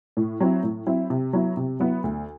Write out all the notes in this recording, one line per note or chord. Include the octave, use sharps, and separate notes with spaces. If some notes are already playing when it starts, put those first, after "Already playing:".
A2
F#3 C4 E4
A2
F#3 C4 E4
C3
F#3 B3 E4
C3
F#3 B3 E4
D2